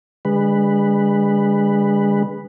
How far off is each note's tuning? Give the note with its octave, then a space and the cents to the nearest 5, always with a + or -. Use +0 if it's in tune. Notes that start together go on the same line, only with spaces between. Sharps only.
D3 -10 G#3 -35 B4 +0